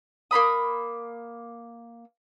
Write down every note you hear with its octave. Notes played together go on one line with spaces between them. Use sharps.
A#3 C#4 B5 D#6